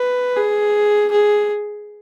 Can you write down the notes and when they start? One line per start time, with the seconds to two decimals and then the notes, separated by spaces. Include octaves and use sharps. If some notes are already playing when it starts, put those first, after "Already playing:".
Already playing: B4
0.37 G#4
1.11 G#4